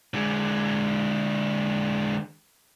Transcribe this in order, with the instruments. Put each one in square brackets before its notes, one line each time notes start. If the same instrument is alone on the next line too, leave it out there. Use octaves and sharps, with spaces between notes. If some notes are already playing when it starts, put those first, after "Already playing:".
[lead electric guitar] D3 G#3